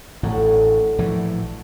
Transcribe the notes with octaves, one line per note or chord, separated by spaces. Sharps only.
A1 A2 D3 F#3 A3
A#1 A2 E3